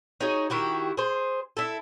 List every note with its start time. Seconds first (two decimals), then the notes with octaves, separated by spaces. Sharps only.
0.21 D#4 F#4 G#4 C#5
0.50 D#3 E4 F#4 G4
0.97 G#4 C5
1.57 E4 A4